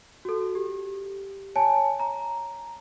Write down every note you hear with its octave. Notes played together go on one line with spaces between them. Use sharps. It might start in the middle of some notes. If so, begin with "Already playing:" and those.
F#4 A4
G4
C#5 G#5 A5
A#5